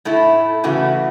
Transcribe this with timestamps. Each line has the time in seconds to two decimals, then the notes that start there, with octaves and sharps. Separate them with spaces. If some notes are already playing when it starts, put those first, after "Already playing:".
0.05 A2 A3 E4
0.64 C#3 E3 A3 F#4